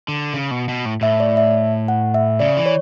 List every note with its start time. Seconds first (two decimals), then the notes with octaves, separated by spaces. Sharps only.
0.08 D3
0.34 C#3
0.51 B2
0.69 B2
0.85 A2
1.01 A2 E5
1.20 D5
1.37 E5
1.88 F#5
2.14 E5
2.40 C#3 D5
2.57 E3
2.66 C#5